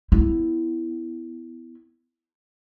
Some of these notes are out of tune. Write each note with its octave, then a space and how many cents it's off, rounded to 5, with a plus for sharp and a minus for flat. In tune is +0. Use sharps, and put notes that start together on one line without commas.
B3 +20 E4 +0